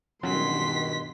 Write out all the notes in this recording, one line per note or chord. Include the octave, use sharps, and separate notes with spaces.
G2 B2 D#3 F#3 C#4 C6 B6